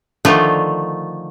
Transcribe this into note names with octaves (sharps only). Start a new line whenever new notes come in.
D3 D#3 F3 A3 F4